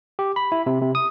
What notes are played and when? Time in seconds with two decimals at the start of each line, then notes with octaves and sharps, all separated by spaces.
0.19 G4
0.36 B5
0.52 E4
0.66 C3
0.82 C3
0.95 D#6